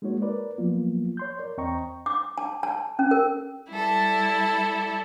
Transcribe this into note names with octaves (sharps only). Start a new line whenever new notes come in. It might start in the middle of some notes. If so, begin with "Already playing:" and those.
G#3 A#3 D#4 F#4 C#5
A#4 B4 D5
F3 F#3 A#3 B3 F4
C#5 C6 G6
A#4 D5
E2 C4 D#5 G5 A#5 C#6
D6
A5
A5
C#4
A#4
G3 E4 A4